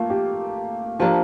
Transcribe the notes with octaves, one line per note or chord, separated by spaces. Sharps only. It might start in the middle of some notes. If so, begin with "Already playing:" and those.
Already playing: A3 A#3 F4
G4
F3 A#3 D4 G4